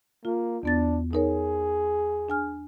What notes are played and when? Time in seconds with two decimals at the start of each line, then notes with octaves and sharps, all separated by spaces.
0.25 A#3 F4
0.63 E2 B3 D4 A6
1.13 D#4 G#4 A#4 C#5
2.29 D4 G#5 F6